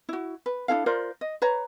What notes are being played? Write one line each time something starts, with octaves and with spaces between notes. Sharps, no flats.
E4 F#4
B4
D4 E4 A4 F5
F4 A#4 C5 D5
D#5
B4 C#5 A#5